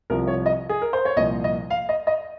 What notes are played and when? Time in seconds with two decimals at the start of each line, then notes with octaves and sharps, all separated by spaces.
0.10 C2 C3 F3 A#4
0.27 C#5
0.46 D#5
0.69 G#4
0.82 A#4
0.93 C5
1.05 C#5
1.17 C2 A#2 F3 D#5
1.44 D#5
1.70 F5
1.89 D#5
2.07 D#5